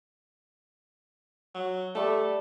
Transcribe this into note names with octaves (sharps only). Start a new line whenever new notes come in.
F#3
G3 A3 A5